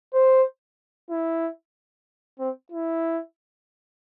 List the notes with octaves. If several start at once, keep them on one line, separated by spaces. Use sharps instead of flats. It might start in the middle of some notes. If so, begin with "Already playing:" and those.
C5
E4
C4
E4